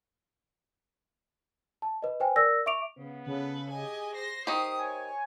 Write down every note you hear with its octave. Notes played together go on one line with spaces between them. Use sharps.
A5
B4 D#5
B4 C5 G5 G#5
A#4 D5 E6 A#6
E5 C#6 D6 D7 F7
C#3 B3
C#3 A4 B4
G4 G#4 D#5 G#5
C5 A#6 C7
D#3 G4 C5 D#6
C#5 G#5